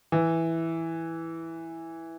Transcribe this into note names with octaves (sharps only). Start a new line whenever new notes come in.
E3